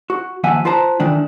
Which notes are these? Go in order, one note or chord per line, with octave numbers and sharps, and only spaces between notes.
F#4
D#2 F3 E5 F#5 G#5
F4 B4 C5 A5 A#5
D#3 E3 A3 D4